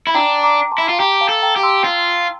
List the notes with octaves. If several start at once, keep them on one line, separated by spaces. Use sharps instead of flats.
E4
D4 G5 A#5
A#5 D6
A5 C6
E4
F4
G4 G5 A#5
F5 A5
A4
G5 A#5
G4
C6 E6
F4